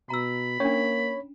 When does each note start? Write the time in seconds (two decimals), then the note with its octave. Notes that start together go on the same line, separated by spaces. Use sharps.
0.10 B2 A#5 B5 E6
0.60 A#3 C#4 D4 C#5